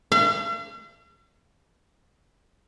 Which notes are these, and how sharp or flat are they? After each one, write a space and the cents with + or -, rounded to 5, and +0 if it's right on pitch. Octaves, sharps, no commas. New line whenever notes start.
F5 -45